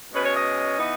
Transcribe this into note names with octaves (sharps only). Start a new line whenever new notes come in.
B2 G#3 C#4 B4
C#5
D#5
E3 B3 D#4